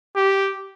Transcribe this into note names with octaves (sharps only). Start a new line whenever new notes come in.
G4